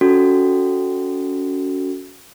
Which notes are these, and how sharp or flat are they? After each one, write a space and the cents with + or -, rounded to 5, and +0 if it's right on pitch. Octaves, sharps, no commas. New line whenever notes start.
C#4 +25 F#4 +0 A4 +5